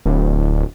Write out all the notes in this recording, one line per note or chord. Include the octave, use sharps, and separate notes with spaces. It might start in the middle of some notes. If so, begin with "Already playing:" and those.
D1